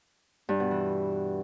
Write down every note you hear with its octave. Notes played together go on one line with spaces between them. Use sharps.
G2
B2
E3